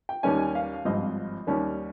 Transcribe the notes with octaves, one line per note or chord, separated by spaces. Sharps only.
G5
D#2 D#3 G3 A#3 C#4 G#5
F5
G#1 G2 F3 C4 D#5
D#2 D#3 G3 C#4